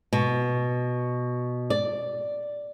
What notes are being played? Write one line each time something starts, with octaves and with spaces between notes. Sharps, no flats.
B2
D5